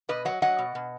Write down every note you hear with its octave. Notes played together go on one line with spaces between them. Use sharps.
B2 B4 D#5
F#3 D#5 F#5
F#3 D#5 F#5
B2
B2